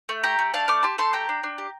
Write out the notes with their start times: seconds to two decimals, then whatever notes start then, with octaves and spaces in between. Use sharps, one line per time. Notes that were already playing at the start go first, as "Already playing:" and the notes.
0.09 A3
0.23 G4 G5 A#5
0.39 A3
0.54 D4 F5 A5
0.68 A3 D6 F6
0.83 G4 A5 C6
0.98 A3 A5 C6
1.13 G4 G5 A#5
1.29 D4
1.43 D4
1.58 G4